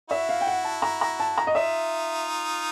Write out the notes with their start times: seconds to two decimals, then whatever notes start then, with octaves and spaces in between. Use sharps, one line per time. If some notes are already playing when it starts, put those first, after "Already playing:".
0.10 E4 F#4 E5
0.29 F5
0.41 G5
0.47 F#5
0.65 A5
0.82 A#5
1.01 A#5
1.20 A5
1.38 A#5
1.47 D#5
1.55 D#4 F4 E5